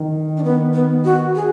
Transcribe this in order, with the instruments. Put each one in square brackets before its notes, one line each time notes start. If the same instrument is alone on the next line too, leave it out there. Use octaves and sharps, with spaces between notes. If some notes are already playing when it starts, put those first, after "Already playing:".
Already playing: [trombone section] D#3
[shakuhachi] D4
B3
B3
F#4
G#4